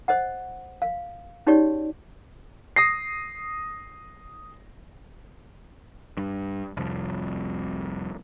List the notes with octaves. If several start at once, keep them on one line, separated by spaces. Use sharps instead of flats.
C5 D#5 F#5
F5
C#4 D#4 F#4 G4 C#5 D5
D#6 A#6 C7
G2
C2 F2